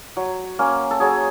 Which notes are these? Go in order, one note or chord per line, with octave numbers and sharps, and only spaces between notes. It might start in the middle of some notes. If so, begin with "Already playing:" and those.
F#3
A#3 C#4
A4
F#3 G#4